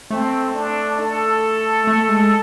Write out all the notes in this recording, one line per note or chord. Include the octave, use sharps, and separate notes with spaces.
A3 C4
D4
A4
A3
G#3